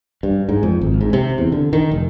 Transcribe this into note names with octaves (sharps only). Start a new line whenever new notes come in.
G2
G#2
F2
G#1
G#2
C3
E2
D3
D#3
F1